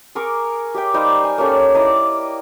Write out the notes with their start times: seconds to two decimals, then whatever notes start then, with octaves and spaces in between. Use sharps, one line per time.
0.15 G#4 A#4 C#6 D6
0.74 G4 E5 G5
0.94 G3 D#4 C5 F5
1.24 G#5
1.38 A#3 C#4 G4 A4
1.74 E4 D5 D#5 A#5